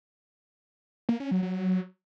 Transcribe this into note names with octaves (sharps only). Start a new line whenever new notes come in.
A#3
C#4
F#3
F#3